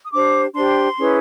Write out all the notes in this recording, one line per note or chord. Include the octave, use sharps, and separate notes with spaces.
D#6
D4 G4 C5 D6
D4 G4 C5 C6
C#4 E4 G#4 B4